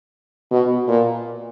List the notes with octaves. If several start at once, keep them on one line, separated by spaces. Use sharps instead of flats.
B2
A#2